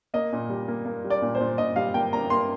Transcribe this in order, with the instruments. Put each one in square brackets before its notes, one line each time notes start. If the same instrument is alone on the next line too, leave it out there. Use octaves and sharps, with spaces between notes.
[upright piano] A#3 D#5
A#2
G3
A#3
A#3
G3
D5
A#2
C5
A#2
A#2 D#5
G3 F5
A#3 G5
A#3 A#5
A#3 C6